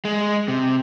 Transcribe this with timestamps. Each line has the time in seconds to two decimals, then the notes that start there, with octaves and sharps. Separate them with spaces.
0.05 G#3
0.48 C3